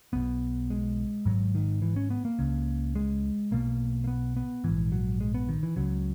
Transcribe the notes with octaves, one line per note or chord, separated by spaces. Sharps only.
B1 B2 B3
G#3
G#1 G#2 F#3
D#3
E3
C#4
B3
A#3
C#2 C#3
G#3
B1 B2 A#3
A#3
B3
B3
A#1 G#2 E3
F#3
G#3
B3
D#3
E3
C#2 C#3 F#3